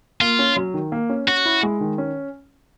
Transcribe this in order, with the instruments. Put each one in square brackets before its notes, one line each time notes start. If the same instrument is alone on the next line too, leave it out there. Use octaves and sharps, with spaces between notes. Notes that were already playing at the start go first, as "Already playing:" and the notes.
[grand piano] A#3 [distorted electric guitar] F4
[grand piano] C#4
F#3
D#3
A#3
C#4
[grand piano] C#4 [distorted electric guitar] F#4
[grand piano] E4
G#3
D#3
C#4